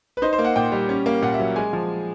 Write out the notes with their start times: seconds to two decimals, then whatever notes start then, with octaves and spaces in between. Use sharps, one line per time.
0.17 B4
0.22 D#4 C5
0.33 C5
0.38 A#3
0.44 F#5
0.56 A#2 G5
0.72 G3
0.89 C#4
1.06 A#3
1.22 A#2 F#5
1.34 E5
1.40 F#3
1.56 G#3 G#5
1.73 F3